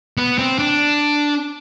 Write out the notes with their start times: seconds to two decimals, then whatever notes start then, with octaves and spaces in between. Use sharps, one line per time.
0.18 B3
0.38 C4
0.59 D4